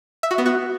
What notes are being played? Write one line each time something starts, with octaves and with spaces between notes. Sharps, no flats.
E5
F#4
B3
F#4